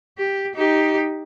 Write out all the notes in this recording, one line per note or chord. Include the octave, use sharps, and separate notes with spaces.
G4
D#4 G4